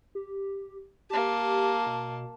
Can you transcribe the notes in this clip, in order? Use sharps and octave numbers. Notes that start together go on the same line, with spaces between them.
G4
A#3 G4 A5
B2